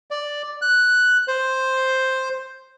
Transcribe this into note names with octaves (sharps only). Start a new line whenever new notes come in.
D5
F#6
C5